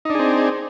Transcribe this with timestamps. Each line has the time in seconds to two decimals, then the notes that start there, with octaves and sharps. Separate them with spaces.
0.05 D#4
0.10 D4
0.15 G#4
0.19 C4